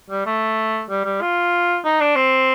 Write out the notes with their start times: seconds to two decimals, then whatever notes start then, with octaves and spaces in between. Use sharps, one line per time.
0.10 G3
0.26 A3
0.89 G3
1.05 G3
1.21 F4
1.84 D#4
2.00 D4
2.16 C4